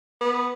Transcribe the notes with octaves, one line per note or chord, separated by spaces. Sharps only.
B3